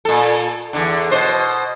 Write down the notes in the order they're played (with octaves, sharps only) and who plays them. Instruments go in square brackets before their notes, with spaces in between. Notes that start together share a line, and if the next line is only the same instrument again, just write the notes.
[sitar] A#2 A4
E2 D3
B2 C5